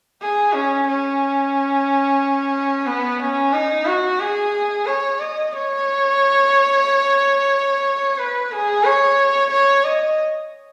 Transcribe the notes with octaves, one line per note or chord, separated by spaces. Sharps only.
G#4
C#4
C#4
B3
C#4
D#4
F#4
G#4
C#5
D#5
C#5
B4
G#4
C#5
C#5
D#5